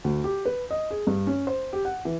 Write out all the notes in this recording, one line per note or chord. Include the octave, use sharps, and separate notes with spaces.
D2
G4
B4
D#5
G#4
G2
C#4
C5
G4
F#5
E3